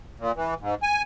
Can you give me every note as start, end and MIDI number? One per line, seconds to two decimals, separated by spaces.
0.20 0.32 46
0.36 0.54 52
0.61 0.75 44
0.83 1.02 80